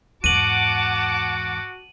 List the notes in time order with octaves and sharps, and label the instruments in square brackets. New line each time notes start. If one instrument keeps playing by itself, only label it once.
[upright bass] E2 G#2 [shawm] F#4 [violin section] F#5 A5 D6 [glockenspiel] D#7 F#7